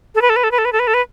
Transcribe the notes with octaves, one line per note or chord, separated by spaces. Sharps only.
A4
B4
A4
B4
A4
B4
A4
B4
A4
B4
A4
B4